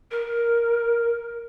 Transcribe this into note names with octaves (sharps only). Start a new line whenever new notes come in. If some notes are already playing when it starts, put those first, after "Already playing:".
A#4